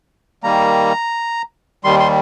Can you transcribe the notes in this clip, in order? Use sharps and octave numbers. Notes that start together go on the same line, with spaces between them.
D#3 G3 A#3 A#5
D#2 D#3 G3 C6
C6